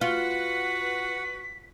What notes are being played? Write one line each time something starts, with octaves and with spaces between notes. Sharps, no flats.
F4 F#4 B4 F#5 B6